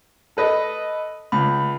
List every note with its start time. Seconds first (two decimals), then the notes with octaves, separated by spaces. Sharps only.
0.37 A4 B4 D#5
1.32 C#2 B5